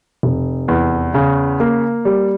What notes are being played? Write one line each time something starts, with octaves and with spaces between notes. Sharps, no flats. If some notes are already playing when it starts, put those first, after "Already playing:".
F1
E2
C#3
A#3
G3